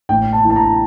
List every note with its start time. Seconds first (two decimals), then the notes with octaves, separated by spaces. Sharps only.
0.09 A1 G5
0.33 A5
0.45 E3
0.50 A5
0.56 A#5